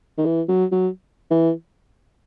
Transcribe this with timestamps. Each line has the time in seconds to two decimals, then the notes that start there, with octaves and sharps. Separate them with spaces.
0.18 D#3
0.25 E3
0.48 F#3
0.72 F#3
1.31 E3